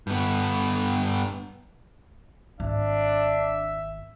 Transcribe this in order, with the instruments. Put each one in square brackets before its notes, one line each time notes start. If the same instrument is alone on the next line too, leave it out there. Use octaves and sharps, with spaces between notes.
[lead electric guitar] G2 B3
[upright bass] G#1 [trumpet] D4 [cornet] E5